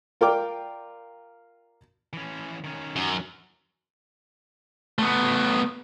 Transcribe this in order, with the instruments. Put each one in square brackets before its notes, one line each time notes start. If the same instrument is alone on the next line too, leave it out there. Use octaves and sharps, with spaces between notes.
[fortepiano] F4 A#4 D5 G5 D6
[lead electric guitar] E3 C#4
D#3 C#4
[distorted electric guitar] F#2
[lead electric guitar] A3 B3